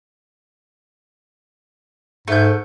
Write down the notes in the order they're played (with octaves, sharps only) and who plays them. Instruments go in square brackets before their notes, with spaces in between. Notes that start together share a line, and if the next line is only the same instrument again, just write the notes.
[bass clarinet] G#2 [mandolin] A3 G6